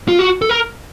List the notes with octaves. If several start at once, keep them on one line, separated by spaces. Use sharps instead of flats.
F4
F#4
A4
A#4